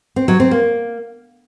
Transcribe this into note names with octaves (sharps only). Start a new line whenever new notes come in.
C4
F#3
C4
A#3